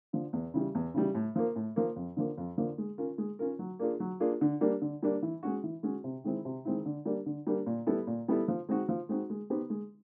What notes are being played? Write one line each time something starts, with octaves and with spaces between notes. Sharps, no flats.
D3 F3
E2
C#3 E3 G3
E2
C#3 E3 G3
A2
F3 A#3
A2
F3 A#3
F2
D3 F3 A#3
F2
D3 F3 A#3
G#3
C#4 F4 A#4
G#3
C#4 F4 A#4
F#3
A#3 D4 F4 G#4
F#3
A#3 D4 F4 G#4
D3
G3 A#3 D4
D3
G3 A#3 D4
E3
G#3 C#4 F#4
E3
G#3 C#4 F#4
C3
D#3 G#3 C4 E4
C3
D#3 G#3 C4 E4
D3
G3 A#3 D4
D3
G3 A#3 D4
A#2
G3 B3 E4 A4
A#2
G3 B3 E4 A4
F3
G#3 C4 D#4 F#4
F3
G#3 C4 D#4 F#4
G#3
B3 D#4 G4 C5
G#3